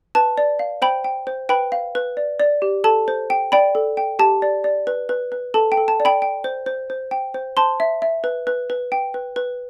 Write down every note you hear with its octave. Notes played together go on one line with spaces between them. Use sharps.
B4 A5
D5
F5
C5 G5 B5
G5
C5
B4 G5 B5
F5
B4
D5
D5
G4
A4 A5
C5
G5
D5 G5 B5
A4
G5
G4 A5
D5
D5
B4
B4
B4
A4 A5
G5
A4
A5
D5
G5 B5
G5
C5
C5
C5
G5
C5
C5 A5 C6
E5
E5
B4
B4
B4
G5
B4
B4